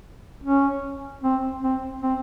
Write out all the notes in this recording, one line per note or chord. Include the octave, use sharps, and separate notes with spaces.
C#4
C4
C4
C4